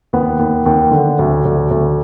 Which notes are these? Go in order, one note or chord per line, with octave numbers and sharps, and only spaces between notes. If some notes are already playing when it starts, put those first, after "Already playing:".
D#2 B3
D#2
D#2
D3
D2
D2
D2